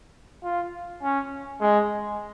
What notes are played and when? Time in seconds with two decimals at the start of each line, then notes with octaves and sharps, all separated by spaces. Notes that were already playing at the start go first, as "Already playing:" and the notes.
0.44 F4
1.03 C#4
1.61 G#3